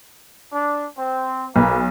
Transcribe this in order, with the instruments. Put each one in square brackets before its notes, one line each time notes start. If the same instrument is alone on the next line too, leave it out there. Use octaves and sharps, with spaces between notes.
[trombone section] D4
C4
[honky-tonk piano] B1 [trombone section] A#3 A#4 B4